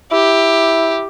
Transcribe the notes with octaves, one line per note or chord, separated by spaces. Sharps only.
E4 G4